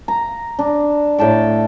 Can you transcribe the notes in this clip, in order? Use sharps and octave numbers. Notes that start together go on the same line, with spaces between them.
A#5
D4
A2 G5 A5 D6